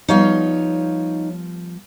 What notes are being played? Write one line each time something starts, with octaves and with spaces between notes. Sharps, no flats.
F3 G3 B3 D#4 C#5 F5